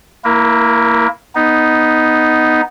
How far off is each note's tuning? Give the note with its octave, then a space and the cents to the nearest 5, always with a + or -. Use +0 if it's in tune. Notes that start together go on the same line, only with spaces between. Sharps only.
A#3 -20 E4 +0 A#4 +25
B3 +0 D#4 +0